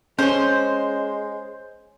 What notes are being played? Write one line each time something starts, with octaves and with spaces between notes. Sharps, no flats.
G#3 C#4 C5 C#5